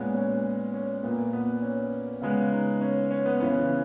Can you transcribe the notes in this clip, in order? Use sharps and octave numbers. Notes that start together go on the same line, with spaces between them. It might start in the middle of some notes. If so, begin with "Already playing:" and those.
Already playing: A#2 G#3 B3 C#4
C#4
C#4
A#2 A#3 B3
B3
C#4
C#3 G#3 B3
D#4
C#4
C#4
B3
C#3 E3 B3 C#4